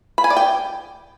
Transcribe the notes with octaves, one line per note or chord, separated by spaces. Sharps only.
B5
G#5
D5
G5